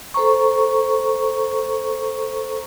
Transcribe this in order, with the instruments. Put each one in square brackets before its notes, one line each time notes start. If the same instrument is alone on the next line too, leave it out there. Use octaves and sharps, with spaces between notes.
[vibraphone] A4 C5 A#5 C#6